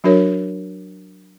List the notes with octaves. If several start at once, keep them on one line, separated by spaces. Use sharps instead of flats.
F#3 D4 F#4 A#4 C#5